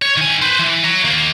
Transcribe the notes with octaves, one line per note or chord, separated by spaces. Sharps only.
C#5
D#3 G#5
B4 C5
E3
C#5 A#5
D#2 A#3